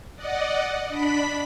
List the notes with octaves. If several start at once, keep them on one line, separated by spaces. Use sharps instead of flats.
D5 D#5 F#5
D4 B5 B6